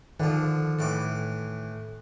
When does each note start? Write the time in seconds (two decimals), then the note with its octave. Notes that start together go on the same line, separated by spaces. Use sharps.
0.20 D3 D#3 F3
0.79 A2 E3 D6